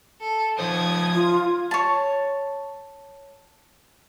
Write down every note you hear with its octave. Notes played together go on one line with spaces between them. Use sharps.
A4
F3 D#4 C5 D#6 G#6
F4
C#5 A5